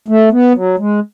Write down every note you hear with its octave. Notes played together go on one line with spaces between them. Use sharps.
A3
B3
F#3
G#3